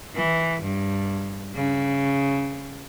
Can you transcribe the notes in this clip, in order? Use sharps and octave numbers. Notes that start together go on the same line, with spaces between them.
E3
G2
C#3